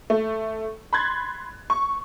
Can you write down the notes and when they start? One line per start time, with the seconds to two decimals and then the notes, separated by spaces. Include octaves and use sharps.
0.10 A3
0.93 B5 C6 F#6 G#6 A6
1.70 C#6